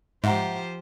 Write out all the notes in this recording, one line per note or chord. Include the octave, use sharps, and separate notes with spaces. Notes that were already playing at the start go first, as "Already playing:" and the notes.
G#2 F3 G4 C5 E5 F#5 A#5